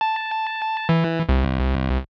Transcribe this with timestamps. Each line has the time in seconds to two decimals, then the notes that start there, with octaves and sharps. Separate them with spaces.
0.01 A5
0.89 E3
1.29 C2